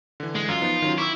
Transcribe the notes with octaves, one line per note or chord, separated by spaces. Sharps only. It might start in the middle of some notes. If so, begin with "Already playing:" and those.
D3 E3
G#3
F#2 F4
F3 B3 D#4
D#3 F#3 C#4
E4 C#6 D6 E6